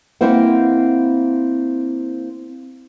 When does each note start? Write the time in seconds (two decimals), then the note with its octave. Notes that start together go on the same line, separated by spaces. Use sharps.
0.21 A#3 C4 E4 C5 F#5